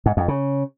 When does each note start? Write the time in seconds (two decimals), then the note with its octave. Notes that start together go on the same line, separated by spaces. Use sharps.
0.06 G#2
0.17 F2
0.28 C#3